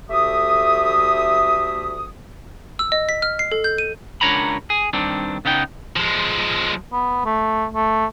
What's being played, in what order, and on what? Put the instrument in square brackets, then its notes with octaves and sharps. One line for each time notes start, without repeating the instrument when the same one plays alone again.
[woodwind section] D2 A3 G4 E5 D#6
[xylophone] E6
D#5
B6
F6
C7
A4
G6
D#7
[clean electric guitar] C#2 D4 A#4 C#5 A#5 B5
G#4
G2 D#3 C4 D4
C#3 B3 D#4 G5
[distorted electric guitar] F3 G#3
[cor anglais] B3
A3
A3